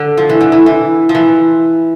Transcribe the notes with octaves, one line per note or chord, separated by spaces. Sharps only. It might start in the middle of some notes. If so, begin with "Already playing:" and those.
Already playing: D3
F3
E3
D3
E3
E3
F3
E3